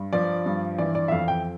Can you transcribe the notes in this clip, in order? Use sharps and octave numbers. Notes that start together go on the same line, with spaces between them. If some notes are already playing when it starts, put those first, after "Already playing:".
Already playing: G2
F3 D5
G2
E3 D5
D5
E5
F2 F5
G5